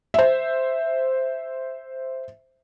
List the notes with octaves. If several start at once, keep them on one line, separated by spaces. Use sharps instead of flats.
C5 E5